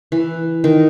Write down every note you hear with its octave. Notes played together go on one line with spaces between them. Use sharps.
E3
D#3